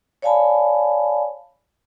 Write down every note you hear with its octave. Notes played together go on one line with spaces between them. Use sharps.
C#5 D5 F5 G#5 A5 B5